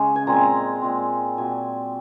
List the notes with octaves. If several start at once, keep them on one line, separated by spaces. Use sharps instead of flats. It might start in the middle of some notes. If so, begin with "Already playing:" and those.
Already playing: C#3 G#3 C#4 D#5
G#5
A#2 G#3 C4 A#5
A#2 G#3 C4
A#2 F#3 C4 G#5